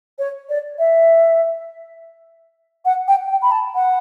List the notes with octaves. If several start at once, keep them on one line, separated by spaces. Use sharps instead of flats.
C#5
D5
E5
F#5
G5
G5
B5
A5
F#5